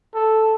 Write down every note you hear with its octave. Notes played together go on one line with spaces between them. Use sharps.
A4